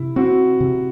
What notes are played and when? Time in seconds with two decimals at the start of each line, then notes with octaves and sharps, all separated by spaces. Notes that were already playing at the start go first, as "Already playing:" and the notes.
Already playing: C3 E4
0.16 C4 F#4
0.60 C3